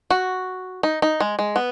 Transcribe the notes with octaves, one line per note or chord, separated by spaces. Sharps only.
F#4
D#4
D#4
G#3
G#3
B3